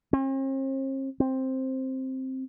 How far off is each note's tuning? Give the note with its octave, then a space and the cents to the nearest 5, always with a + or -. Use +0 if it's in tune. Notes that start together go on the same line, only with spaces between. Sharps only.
C4 +45
C4 +5